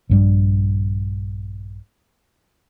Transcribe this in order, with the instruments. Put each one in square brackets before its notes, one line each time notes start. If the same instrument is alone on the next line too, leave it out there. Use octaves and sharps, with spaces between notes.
[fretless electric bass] A#1 G2 G3